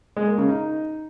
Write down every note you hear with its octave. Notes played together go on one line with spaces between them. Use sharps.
G#3
A#3
C#3
D#4